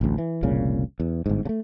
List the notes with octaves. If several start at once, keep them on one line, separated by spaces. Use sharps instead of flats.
A1 D2
E3
F1 C2 A#2 C#3
E2
G1 G#2
C#3 A3